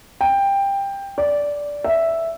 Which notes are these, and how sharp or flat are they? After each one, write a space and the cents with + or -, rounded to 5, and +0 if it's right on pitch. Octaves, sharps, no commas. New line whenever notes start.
G5 +15
D5 -10
E5 +0